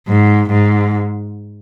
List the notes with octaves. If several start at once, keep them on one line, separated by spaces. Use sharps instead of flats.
G#2
G#2